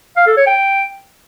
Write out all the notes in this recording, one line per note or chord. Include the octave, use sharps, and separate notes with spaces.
F5
A4
C#5
G5